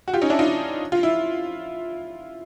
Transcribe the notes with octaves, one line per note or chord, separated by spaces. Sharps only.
F#4
F4 G4
C#4 D#4
D4 E4
D#4 F4
F4
E4